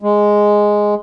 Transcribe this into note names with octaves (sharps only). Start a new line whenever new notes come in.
G#3